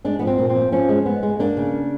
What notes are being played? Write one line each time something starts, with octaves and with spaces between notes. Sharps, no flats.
G#3 D4
F3 B3
C4
A#2
C4
F3
F3 C#4
G#3
B3
G#3
A#3 D4
C#3